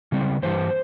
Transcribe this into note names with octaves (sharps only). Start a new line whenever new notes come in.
C#3 G3 C4
G2 E3 G3 C5